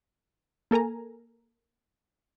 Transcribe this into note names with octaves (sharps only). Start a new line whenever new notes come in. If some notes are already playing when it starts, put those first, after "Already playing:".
A#3 A4 A#4 G#5 A#5